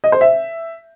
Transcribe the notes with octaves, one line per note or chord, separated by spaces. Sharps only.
D#5
C5
E5